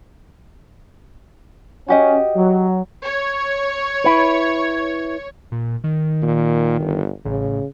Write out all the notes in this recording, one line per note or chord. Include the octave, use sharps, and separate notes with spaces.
C#4 F#4 G4 D#5
F#3
C#5
E4 B4
A#2
D#3
A#2
G1
A1 C#3